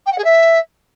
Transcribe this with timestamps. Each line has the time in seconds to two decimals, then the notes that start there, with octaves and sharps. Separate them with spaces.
0.06 G5
0.12 F#5
0.18 G#4
0.24 E5